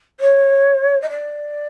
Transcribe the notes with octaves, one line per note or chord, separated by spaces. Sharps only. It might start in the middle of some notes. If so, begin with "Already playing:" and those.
C#5
D#5
D5